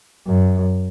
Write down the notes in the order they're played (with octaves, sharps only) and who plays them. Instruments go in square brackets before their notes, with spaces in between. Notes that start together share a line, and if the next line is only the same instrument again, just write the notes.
[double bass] F#2